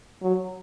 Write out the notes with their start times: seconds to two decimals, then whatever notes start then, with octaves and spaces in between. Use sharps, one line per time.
0.22 F#3